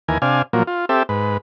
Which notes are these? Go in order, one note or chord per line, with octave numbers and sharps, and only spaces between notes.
D#2 E3 A#4 G#5
C3 D4 F5 G#5
A#2 F3 F#3 A#3
F4
C4 G4 A4 E5
G#2 B4